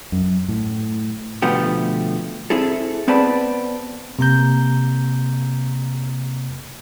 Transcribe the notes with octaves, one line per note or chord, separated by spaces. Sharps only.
F#2
A2
B2 D3 F3 A3 B3 G4
C4 E4 G#4 A4
B3 C4 B4 D5 A5 B5
C3 A#3 A#5 G6